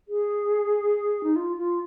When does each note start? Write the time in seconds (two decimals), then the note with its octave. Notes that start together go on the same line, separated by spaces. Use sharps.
0.08 G#4
1.23 D#4
1.36 F4
1.57 F4